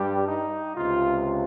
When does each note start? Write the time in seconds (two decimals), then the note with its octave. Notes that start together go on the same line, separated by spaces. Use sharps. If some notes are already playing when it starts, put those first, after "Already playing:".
Already playing: G2 G3 G4
0.28 D#4
0.75 C#2 C3 F4